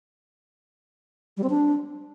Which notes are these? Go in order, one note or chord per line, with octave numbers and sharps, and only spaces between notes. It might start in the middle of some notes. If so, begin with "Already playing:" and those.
G3
C4
D4